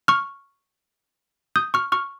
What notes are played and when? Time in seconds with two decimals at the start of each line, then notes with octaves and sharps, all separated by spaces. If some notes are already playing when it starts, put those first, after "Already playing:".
0.08 C#6 F6
1.56 D#6 G6
1.74 C#6 F6
1.92 C#6 F6